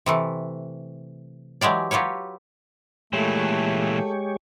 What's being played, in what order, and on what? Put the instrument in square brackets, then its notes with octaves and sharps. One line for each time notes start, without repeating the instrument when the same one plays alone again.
[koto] C3 E3 A3
E3 F#3 G#3 G4 D5
F#3 F4 G4 B4 C#5
[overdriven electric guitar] A#2 E3 [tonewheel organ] G#3 G4 C#5 [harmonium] A3